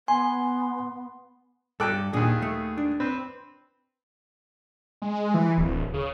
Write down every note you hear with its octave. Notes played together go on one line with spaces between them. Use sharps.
B3 G#5 C6
G2 A4 G5 A#5 D6 F#6
D#2 A#2 D4 G#4
A3
D4
C4 B4
G#3
E3
D1
C#3